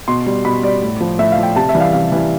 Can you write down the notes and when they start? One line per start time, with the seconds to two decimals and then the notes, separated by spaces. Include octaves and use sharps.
0.08 B2 C6
0.26 G3
0.45 B2 B5
0.63 G3 D5
0.82 A2
1.01 F3
1.19 A2 E5
1.32 F5
1.37 F3
1.43 G5
1.56 C3 A5
1.69 E5
1.75 E3 G3
1.80 F5
1.93 C3 F5
2.12 E3 G3